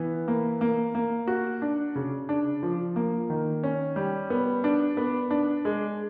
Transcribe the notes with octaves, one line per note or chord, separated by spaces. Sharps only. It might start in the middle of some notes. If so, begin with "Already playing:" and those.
Already playing: E3 B3
A#3
A#3
A#3
F#4
D4
C#3
D4
F3
A#3
D#3
C#4
G3
B3
D4
B3
D4
G#3